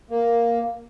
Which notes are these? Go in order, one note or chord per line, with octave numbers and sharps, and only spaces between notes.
A#3